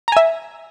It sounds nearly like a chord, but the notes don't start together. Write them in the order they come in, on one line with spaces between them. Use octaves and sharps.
A#5 G#5 E5